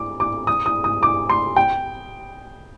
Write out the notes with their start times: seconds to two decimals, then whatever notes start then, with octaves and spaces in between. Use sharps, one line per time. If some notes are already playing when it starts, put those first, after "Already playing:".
Already playing: D6
0.20 D6
0.47 D#6
0.66 D#6
0.84 D#6
1.03 D6
1.30 C6
1.56 G5